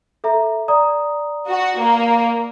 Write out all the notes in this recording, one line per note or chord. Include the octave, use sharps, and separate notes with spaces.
A4 E5 A#5
D5 A#5 D#6
F#4
A#3